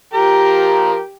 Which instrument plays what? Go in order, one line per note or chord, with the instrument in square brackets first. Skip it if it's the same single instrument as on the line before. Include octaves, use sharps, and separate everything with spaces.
[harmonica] F3 A#4 A#5 [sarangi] G4